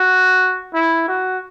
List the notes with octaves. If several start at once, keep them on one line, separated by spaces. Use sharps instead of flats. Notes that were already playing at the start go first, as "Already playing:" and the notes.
Already playing: F#4
E4
F#4